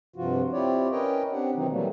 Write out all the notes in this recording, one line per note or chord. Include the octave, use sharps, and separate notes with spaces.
G2 C3 F3 F4 F#4
C4 E4 F4 G4 C#5 D5
C#4 A#4 B4 C#5 D#5 G5
C4 D4 G4 F#5
B2 D#3 E3 F#3 C4 D#4
E3 F#3 G3 A3 A#3